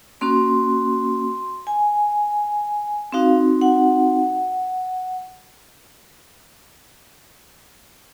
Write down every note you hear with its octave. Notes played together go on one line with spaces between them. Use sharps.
A#3 C#4 F#4 C6
G#5
C4 D#4 F#4 F5
F#5